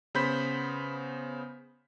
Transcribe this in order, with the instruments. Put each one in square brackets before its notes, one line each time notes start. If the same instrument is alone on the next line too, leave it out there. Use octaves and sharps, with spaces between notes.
[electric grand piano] C#3 B3 C5 B5 G6 B6